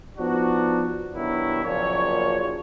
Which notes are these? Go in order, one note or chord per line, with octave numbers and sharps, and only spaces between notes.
F3 B3 D4 D#4 F#4
G2 B2 D#3 F#3 D4 E4
F#1 A#2 F3 C#5